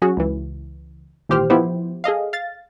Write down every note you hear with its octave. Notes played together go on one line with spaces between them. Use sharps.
F#3 C#4 F#4 G#4
C#2 E3
G#1 A#2 E3 G4 C5 F6
F3 B3 E4 G4 C5
G#4 A4 D#5 F5
F5 A6